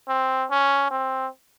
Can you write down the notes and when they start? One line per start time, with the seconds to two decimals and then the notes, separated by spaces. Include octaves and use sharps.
0.09 C4
0.50 C#4
0.91 C4